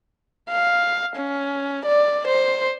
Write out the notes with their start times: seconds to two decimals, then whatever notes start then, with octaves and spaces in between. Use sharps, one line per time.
0.51 F5
1.16 C#4
1.86 D5
2.27 C5